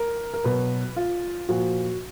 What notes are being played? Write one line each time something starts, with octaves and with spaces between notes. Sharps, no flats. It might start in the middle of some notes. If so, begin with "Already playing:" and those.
Already playing: A#4
A#4
B2 F#3 B4
F4
A#2 F3 F#4